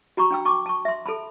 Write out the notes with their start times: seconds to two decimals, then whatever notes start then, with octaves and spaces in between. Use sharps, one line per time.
0.17 F#4 A#5 B5 C#6
0.31 D4 G5 E6
0.45 A5 C#6 D6
0.66 A5 C#6
0.85 E5 C6
1.06 A4 A5 B5